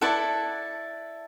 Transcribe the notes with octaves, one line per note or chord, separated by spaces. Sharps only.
E4 A4 D5 F#5 A5